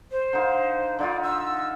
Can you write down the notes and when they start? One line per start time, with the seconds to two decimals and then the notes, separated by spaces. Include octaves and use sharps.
0.11 C5
0.33 D3 D#4 F5
0.99 D3 D#4 F4 D5
1.23 E6